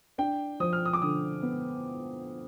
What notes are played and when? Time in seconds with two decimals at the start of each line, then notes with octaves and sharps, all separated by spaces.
0.18 D4 G5
0.60 F3 D#6
0.73 F6
0.85 D#6
0.93 D6
1.01 D3 D#6
1.43 B3